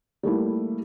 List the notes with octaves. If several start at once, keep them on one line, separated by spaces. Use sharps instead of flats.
G3 A3 A#3 E4